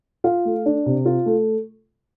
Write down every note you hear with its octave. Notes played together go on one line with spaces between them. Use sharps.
F4 F5
A3
D4
C3
F4
A3